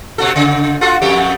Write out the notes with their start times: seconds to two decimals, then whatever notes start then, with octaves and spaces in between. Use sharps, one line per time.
0.18 B2 F#4 A4
0.36 C#3
0.81 F4 F#4 A4
1.01 F2 A3 G4